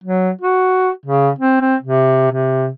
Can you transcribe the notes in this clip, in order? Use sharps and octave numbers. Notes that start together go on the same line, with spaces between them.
F#3
F#4
C#3
C4
C4
C3
C3